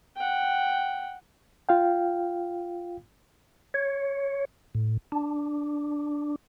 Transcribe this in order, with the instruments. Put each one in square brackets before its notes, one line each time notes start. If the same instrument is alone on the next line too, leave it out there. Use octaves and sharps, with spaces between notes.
[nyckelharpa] F#5 G5
[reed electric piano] F4 F5 G5
[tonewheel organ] C#5
A2
D4